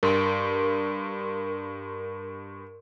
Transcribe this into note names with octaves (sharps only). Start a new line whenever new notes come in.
G2 A#4 C6 D7